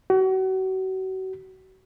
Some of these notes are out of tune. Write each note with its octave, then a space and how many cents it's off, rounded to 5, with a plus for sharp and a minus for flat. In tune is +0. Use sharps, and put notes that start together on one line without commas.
F#4 +35